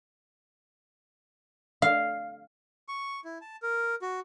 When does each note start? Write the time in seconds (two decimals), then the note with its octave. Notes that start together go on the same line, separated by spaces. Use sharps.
1.82 F5
2.88 C#6
3.25 E4
3.41 A5
3.63 A#4
4.02 F#4